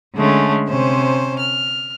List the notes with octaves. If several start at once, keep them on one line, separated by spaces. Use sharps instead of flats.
D3 G#3 A3 C#4
C3 C#4 C5
F6